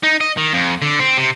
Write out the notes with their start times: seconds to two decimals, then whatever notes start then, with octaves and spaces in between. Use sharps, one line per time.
0.03 D#4
0.20 D#5
0.37 D#3
0.53 F2
0.82 D3
0.99 C4
1.18 C3